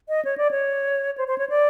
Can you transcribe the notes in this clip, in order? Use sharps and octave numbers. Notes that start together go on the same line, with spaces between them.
D#5
C#5
D5
C#5
C5
C5
C#5
D5